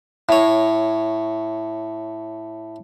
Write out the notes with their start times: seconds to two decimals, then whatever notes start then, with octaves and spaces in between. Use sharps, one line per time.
0.29 A2 C#5